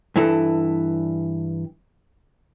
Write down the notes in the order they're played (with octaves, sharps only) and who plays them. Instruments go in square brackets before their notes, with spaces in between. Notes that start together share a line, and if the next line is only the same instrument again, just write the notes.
[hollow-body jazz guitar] G2 E3 E4 A4